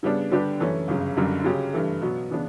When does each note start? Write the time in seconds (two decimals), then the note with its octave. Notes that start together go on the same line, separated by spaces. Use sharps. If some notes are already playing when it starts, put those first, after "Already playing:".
0.03 C#3 G3 B3 D4
0.31 D3 G3 D4 G4 B4
0.60 F#2 E3 A3 C#4
0.88 G1 F#2 C#3
1.17 F#1 F#2 D3 G3
1.44 C#3 F#3 C#4 G4
1.73 G2 E3 A3
2.01 B2 F#3 B3
2.31 C#3 E3 B3 D4